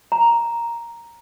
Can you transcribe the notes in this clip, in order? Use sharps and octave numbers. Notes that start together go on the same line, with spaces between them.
A#5